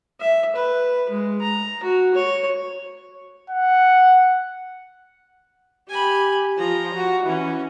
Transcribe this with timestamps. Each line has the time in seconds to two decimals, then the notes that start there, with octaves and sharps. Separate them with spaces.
0.20 E5
0.56 B4
1.10 G#3
1.41 A#5
1.83 F#4
2.14 C#5
3.50 F#5
5.89 G4 G#5 B5
6.58 F3 A#5
6.95 F#4
7.27 E3 C#4